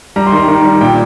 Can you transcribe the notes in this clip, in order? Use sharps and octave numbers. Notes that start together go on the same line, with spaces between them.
G3 A#5
C6
D#3
A#5
D#3
G3
A#2 G5